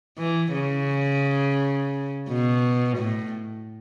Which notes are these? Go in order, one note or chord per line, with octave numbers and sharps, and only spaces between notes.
E3
C#3
B2
A2